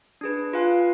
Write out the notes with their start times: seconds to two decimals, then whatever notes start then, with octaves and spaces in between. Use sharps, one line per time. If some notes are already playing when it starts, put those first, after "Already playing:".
0.21 D4 G#4 B4
0.53 F4 B4 F5 G#5